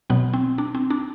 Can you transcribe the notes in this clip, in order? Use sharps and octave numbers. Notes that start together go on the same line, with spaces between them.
B2 F#3 B3
C4
D4
C4
D4